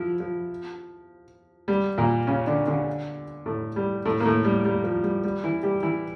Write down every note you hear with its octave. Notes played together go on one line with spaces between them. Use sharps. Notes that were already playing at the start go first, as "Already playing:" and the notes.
Already playing: F3 E4
F3
G3
A#2 A#3
C#3 C#4
D3 D4
D3 D4
A2 A3
G3
A2 A3
A#3
A2 A3
G3
G3
F3
G3
G3
E3 E4
G3 G4
E3 E4